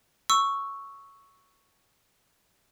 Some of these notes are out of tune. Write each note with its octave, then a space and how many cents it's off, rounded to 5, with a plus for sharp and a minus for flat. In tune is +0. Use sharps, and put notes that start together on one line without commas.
C#6 +0 E6 +0